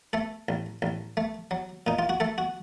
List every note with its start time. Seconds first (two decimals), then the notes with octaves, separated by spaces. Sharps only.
0.13 A3 A4
0.49 A1
0.82 A1
1.17 A3
1.51 F#3
1.87 A#2 D#4
1.99 F4
2.09 F#4
2.20 A3 A4
2.38 F#4